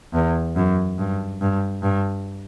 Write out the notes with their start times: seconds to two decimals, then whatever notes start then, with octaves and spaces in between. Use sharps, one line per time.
0.14 E2
0.56 F#2
0.98 G2
1.41 G2
1.82 G2